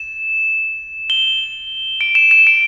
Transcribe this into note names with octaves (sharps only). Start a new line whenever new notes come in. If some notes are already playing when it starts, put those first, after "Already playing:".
Already playing: E7
G7
D7
E7
E7
D7